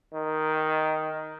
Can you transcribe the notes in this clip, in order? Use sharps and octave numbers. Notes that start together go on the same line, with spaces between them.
D#3